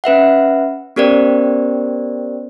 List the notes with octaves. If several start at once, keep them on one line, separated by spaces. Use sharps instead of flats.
C#4 B4 E5 F#5
B3 C#4 G4 A#4 C5 D5